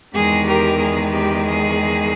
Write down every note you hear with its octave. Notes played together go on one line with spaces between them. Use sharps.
E2 D#3 G#3 G#4
G4 A#4
G#4
G4
G#4